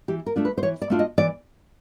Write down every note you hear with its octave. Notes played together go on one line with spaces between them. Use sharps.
E3 G4
A#4
A3 D4 F4
B4
C5
E3 C#5
D5
A3 D4 F4
D#5
E3 D5